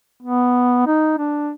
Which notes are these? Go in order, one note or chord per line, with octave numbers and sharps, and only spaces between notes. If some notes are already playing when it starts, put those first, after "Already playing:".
B3
D#4
D4